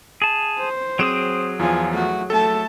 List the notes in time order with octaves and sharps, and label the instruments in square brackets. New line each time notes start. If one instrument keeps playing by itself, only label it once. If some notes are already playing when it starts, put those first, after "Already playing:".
[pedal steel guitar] G#4 A5
[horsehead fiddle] C5
[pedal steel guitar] F#3 G#4 D#6 [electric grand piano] C4 D7 E7
[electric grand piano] E2 F3 [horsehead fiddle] F4 G#5
[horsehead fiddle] A3 F#4
[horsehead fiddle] A3 A5 [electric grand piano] A4